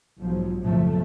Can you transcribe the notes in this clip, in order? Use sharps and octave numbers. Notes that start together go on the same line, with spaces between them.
B1 G#2 F3 F#3
F#1 B1 F#2 A2 F3 A3